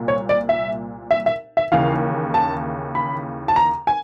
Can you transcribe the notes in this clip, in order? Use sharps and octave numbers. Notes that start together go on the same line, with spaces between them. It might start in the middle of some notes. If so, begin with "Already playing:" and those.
Already playing: C2 A#2
C#5
D5
E5
E5
E5
E5
D#2 C#3 E3 F5
A5
B5
A5
A#5
G#5